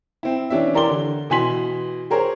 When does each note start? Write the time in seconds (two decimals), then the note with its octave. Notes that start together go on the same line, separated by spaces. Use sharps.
0.23 C4 E4
0.50 E3 C#4 D4 G4 E5
0.74 E3 G4 A#4 D5 C6 G7
0.89 D3
1.30 B2 E3 G#5 C6 B6 F#7
2.10 G4 G#4 A#4 C5 C#5